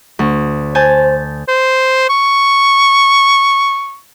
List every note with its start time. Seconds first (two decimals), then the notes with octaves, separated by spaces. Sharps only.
0.19 D2
0.75 C5 G#5 A5 G6
1.48 C5
2.09 C#6